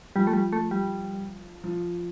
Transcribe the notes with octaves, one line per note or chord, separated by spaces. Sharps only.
F3 G3
A3
G3
A3
G3
F3